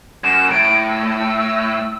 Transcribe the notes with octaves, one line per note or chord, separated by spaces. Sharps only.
F#2 E7
A2 D7
E6